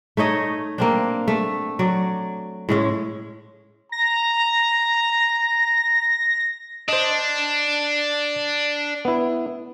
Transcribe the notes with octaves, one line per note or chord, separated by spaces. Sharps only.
A3 D#4 C#5 D#5
A#3 C4 D4
A3
F#3 D5
A2 G#3 C#4
A#5 A#6
D4 C5 D#5
B3 E4